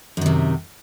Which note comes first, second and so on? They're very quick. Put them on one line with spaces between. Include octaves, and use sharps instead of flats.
F#2 D#3 C3